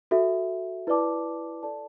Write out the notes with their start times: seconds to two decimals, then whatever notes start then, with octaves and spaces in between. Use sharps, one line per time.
0.11 F#4 A4 E5
0.87 E4 B4 D5 A5 D6
1.63 A4 D5 A5